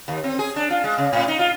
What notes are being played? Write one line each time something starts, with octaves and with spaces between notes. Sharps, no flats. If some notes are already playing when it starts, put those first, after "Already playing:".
D#2
C4
G#4
D4
F4
G#3
C#3
A2
D#4
F4